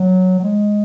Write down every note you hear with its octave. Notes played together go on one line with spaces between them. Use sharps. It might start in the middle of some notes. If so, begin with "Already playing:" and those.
Already playing: F#3
F#3
G#3